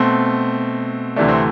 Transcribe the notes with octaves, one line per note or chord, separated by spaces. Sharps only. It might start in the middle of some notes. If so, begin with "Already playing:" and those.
Already playing: B2 A3 C4
D2 C3 E3 A3 D4
C4